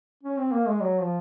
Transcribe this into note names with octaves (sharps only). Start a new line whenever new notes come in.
C#4
C4
A#3
G#3
F#3
F3